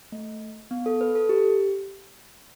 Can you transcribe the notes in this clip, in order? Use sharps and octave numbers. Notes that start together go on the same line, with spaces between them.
A3
B3
A4
B4
A4
G4